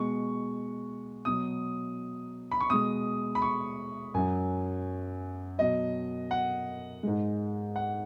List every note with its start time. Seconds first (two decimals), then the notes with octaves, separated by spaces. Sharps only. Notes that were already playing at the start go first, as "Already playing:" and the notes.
Already playing: B2 G#3 C#6
1.25 B2 F#3 D#6
2.51 B5
2.60 C#6
2.70 B2 G#3 D#6
3.35 B5
3.42 C#6
4.14 F#2 F#3 G#5
5.58 B2 F#3 D#5
6.31 F#5
7.03 G#2 G#3
7.76 F#5